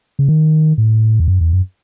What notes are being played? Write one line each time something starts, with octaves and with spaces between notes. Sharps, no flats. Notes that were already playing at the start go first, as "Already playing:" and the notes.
C#3
D#3
A2
E2
F#2
E2
F#2